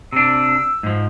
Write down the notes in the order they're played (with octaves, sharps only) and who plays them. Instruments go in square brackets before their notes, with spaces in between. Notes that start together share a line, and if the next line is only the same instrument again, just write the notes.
[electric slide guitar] C3 D4 [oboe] E6
[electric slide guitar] G#2 F3